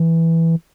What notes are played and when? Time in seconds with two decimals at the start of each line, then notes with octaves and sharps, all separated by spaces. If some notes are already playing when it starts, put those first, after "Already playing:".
Already playing: E3